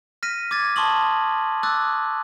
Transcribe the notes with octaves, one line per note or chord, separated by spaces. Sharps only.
F6 A#6 B6 D#7
D6 G#6 A6
A5 C6 C#6 D#6 F#7
D6 E6 F#6 A6